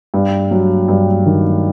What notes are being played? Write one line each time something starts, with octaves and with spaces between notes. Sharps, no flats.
G2
F#3
G2
D#3